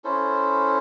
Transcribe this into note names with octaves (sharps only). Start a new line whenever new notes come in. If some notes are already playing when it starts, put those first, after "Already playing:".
C#4 E4 A4 C5